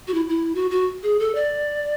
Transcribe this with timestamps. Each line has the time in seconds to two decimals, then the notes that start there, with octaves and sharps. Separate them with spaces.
0.08 F#4
0.14 E4
0.29 E4
0.55 F#4
0.71 F#4
1.03 G#4
1.20 A4
1.35 D5